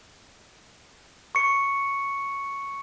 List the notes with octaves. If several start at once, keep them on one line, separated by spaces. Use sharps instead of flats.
C#6 C#7